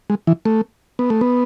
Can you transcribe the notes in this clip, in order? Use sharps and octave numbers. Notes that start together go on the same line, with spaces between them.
G#3
E3
A3
B3
A3
B3